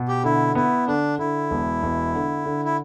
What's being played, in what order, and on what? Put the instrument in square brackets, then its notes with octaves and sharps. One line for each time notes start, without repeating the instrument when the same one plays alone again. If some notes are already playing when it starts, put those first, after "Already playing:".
Already playing: [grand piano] B2
[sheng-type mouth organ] G4
[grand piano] D3 [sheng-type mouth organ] E4
[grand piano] B3 [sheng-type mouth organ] E4
[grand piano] D3 [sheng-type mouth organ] D4
[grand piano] D3 [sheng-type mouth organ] E4
[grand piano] E1
E1
D3
D3
[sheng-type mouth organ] E4